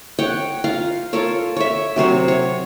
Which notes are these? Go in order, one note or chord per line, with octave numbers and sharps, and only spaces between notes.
C#5 F#5 G5
F4 F5 A#5
F4 A4 A#4 C#5
C#5 E5
C3 F#3 C5 C#5
C#5